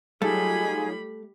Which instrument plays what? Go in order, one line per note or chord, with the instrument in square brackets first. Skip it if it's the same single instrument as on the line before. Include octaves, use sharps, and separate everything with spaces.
[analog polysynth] F#3 D#4 F4 [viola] G3 B5 [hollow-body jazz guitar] A3 [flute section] G#4